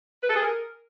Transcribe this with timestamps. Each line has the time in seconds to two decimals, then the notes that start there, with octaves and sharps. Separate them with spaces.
0.23 B4
0.29 A4
0.36 G#4
0.42 A#4